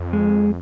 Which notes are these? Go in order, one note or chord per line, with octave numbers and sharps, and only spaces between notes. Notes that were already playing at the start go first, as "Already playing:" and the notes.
Already playing: F2
G#3